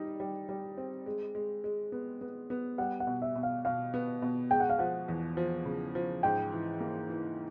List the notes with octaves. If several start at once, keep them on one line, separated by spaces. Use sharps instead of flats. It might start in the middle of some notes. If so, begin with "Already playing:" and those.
Already playing: G3 D#4
G3
G3
C4
G#3
G#3
G#3
B3
B3
B3
G3 F#5
F#5
B2
E5
B2
F5
B2 F5
B3
B2
G#3 G5
F#5
F5
F3 F#5
E2
F3
C#3
F3
G#2 G5
E3
A#3
E3